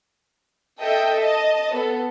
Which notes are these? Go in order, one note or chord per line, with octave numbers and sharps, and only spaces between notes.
A4 D#5 E5 G5
D#5 A5
B3 A4